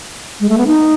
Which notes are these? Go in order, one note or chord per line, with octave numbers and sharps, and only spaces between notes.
G#3
A3
B3
D#4